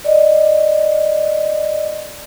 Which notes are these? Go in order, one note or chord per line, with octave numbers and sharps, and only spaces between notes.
D5 D#5